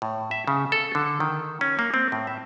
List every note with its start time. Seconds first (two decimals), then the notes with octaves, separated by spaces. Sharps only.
0.02 A2
0.31 E5
0.47 C#3
0.72 A4
0.95 D3
1.20 D#3
1.61 C#4
1.79 A#3
1.94 C4
2.12 A2
2.27 E5